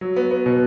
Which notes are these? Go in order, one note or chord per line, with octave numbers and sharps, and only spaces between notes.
F#3
B3
B3
B2